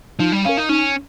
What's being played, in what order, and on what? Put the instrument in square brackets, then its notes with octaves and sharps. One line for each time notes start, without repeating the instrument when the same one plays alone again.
[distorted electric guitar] F3 [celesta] D#4
[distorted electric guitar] G3
[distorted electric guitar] C#4 [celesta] A#4 F5
[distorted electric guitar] D#4
[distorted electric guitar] C#4 [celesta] D#4